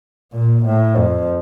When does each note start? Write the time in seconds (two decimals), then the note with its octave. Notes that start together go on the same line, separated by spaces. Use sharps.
0.33 A#2
0.66 A2
0.97 F2